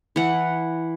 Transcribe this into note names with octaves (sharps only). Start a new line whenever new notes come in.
E3 F#5